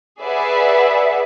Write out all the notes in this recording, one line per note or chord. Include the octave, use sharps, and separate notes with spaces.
G#4 B4 D5 E5 F#5